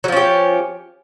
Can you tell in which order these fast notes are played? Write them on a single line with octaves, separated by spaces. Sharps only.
F#3 F3 C#4 G4